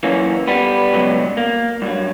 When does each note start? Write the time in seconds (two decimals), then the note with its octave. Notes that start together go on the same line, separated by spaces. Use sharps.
0.03 F#2 E3 A#3 C#4
0.48 G3 B3
0.93 C#2 B2 F#3
1.37 A#3
1.82 G2 F#3